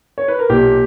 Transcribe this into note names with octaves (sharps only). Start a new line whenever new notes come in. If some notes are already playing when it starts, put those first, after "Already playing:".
C#5
B4
A#4
B1 A#2 A#3 G4